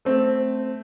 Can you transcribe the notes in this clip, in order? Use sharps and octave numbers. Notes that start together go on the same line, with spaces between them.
A3 C4